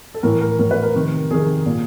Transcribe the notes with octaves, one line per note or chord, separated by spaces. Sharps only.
A4
A2 E3 A#4
A#4
A2 E3 A#4
B4
A#4
C3 D#3
C3 D#3 G#4
A#2